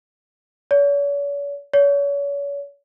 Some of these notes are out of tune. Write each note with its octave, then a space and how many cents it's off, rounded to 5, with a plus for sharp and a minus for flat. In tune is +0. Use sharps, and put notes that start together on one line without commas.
C#5 +45
C#5 +35